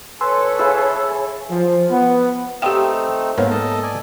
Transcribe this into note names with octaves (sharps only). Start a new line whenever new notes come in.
A4 B4 C#5 G#5 C6 E6
G#4 E5 F5 B5 E6
F3
B3
A3 C4 D#4 G4 D#5 F5 G5
G#2 A#3 B3 C#5 F5
A4 D#5 A5
D5 G#5